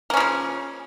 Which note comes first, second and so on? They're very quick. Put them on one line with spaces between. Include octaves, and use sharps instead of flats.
A#3 C#4 F3 C#3